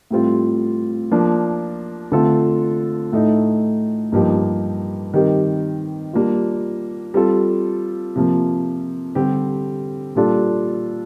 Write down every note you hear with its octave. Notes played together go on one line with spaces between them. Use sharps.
A2 G3 C4 F4
F3 A#3 D4
D3 A3 C4 F4 A4
A2 A3 D#4
G2 F3 A#3 D#4 G4
D#3 G3 C4 G4 A#4
G3 A#3 D4 F4
G3 C4 F4 A4
C3 F3 A#3
D3 G3 C4 G4
A#2 G3 D4 F4 A4